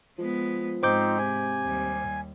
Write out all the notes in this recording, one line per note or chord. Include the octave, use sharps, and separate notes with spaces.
F3 G#3 B3
G#2 C4 D#4 C5 D6 G6
C3 G#5
D#2 G3